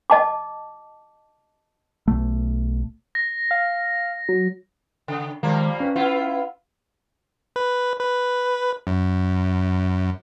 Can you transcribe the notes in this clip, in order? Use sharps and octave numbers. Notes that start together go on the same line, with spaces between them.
D#5 A5 D6
B1 A3
A#6
F5
F#3
C#3
D#3 F3 G3 G#3 A#3 A#5
C#4 B4
B3 E4 F4
B4
B4
F#2